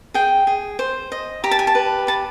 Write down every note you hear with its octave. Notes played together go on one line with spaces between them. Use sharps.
G#4 G5
G#4
C5
D#5
G4 A#5
A5
G#5
A5
B4
B4 A5